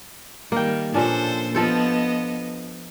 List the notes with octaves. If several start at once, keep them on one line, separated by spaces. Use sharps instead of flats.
D#3 G3 A#3 G5
A#2 F3 C#4 D4 A4 C5
F3 B3 A4 C5 D#5